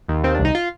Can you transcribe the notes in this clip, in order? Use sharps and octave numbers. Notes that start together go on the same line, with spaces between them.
D#2
D#3 C4
D4
C2
D#4
F4